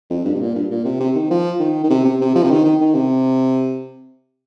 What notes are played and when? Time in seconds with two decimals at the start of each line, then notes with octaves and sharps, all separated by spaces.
0.10 F2
0.25 G2
0.34 C3
0.41 A#2
0.55 G2
0.71 A#2
0.85 C3
1.00 C3
1.15 D#3
1.31 F3
1.59 D#3
1.84 D#3
1.89 C3
2.05 C3
2.21 C3
2.35 F3
2.43 C3
2.51 D#3
2.64 D#3
2.81 D#3
2.95 C3